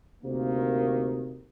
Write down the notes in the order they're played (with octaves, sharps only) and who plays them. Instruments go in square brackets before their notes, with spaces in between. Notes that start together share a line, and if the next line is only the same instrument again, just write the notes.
[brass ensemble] D2 C3 D#3 A#3